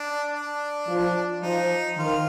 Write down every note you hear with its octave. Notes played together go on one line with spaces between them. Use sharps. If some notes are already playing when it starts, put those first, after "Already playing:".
Already playing: D4
D4
F3
F3 D#4
D#3 F4